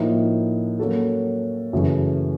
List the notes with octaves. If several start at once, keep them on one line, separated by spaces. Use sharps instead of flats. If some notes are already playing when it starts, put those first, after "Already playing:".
Already playing: A2 F3 A#3 D#4
F#3 A#3 C#4 F#4 A4
F#2 C#3 E3 A3